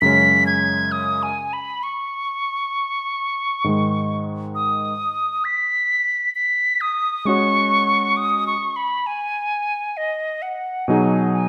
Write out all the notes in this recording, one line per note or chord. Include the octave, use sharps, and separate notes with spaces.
F#2 C#3 G#3 C#4 B6
G#6
D#6
G#5
B5
C#6
G#2 D#3 G#3
D#6
B6
B6
D#6
G#3 C#4 F#4 C#5 C#6
D#6
C#6
B5
G#5
D#5
F#5
B2 F#3 D#4 G#4 G#5
G#5